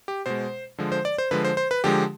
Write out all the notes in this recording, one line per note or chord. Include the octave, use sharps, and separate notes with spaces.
G4
B2 G#3 C5
D3 F3 G#3
C5
D5
C5
D3 F3 G#3 B4
C5
C5
B4
D3 F3 G#3 G4